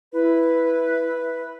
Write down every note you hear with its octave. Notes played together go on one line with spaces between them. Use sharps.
E4 B4